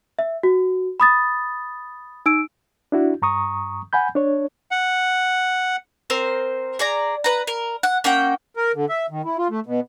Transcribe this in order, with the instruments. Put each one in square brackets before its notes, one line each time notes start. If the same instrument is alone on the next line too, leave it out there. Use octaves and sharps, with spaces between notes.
[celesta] E5
F#4
B5 D#6 A6
D#4 E6 D7
[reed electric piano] D4 E4 F#4
G2 A#5 C#6 D#6
F#5 G#5 B5 G6
D4 C#5
[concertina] F#5
[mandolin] C4 A#4 C5
G#4 D5 A#5
B4 A#5
A#4
F#5
A#3 C#4 F#5 G5
[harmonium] A#4
D3
E5
D#3
E4
F4
A3
B2